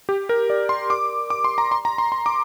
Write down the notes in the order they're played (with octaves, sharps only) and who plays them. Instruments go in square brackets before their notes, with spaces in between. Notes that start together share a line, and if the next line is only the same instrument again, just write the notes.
[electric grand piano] G4
A#4
D5
C6
D6
D6
C6
A#5
C6
A#5
C6
C6
D6